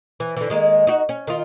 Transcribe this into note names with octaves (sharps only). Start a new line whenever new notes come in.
E3
D3 E3
D#3 G#3 A#3
D#4 F#4
C#4
D#3 F4